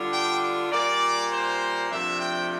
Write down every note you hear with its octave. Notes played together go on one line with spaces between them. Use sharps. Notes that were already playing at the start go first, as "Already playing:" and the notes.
Already playing: D3 G3 D4 F4
G5
A#2 G3 A#3 D5
C5
C3 F3 A3 D4 E5
G5